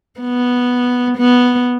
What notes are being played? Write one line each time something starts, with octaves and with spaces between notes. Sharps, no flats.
B3
B3